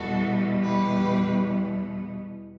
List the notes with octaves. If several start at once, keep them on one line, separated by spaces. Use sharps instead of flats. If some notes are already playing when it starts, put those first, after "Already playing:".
Already playing: E2 B2 G3 B3 F#4 A4
G4 B4